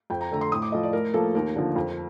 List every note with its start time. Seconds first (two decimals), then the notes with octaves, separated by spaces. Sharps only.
0.10 F2 G5
0.21 A#5
0.31 D3 A3 A#5
0.41 C6
0.52 A2 D#6
0.62 D6
0.72 F3 A3 D#5
0.83 D5
0.93 A2 A#4
1.14 F3 A#3 A4
1.35 D#2 A#4
1.56 D3 F3
1.76 F2